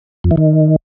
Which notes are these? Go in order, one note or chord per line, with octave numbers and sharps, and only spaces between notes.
F2
E3
D#3